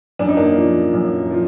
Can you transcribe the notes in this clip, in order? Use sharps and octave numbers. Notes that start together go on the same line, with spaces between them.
F#2 D4
D#4
A#3 D4
F3
F#2
F3